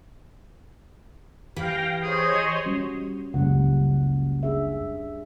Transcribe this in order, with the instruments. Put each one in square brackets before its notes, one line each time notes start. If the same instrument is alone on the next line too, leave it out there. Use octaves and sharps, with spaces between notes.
[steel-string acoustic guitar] E3 [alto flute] G4 [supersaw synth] F5 G5 A#6
[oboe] G#4 [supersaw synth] C5 C#5 D#5
[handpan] G3 C#4 F#4
[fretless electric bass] F#1 C#2 [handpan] G3 F#5
[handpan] D4 G#4 E5